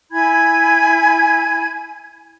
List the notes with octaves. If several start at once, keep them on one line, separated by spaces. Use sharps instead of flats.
E4 G#5 B5 G#6